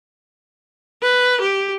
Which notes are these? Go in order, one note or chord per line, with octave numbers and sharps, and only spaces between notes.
B4
G4